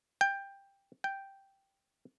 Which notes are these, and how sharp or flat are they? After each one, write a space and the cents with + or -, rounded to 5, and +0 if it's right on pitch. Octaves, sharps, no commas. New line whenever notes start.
G5 +15
G5 +0